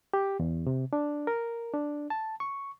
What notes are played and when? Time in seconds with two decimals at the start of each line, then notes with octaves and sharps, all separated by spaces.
0.14 G4
0.40 E2
0.67 C3
0.93 D4
1.27 A#4
1.73 D4
2.10 A5
2.40 C#6